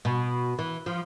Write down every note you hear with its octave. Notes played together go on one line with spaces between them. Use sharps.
B2
E3
F3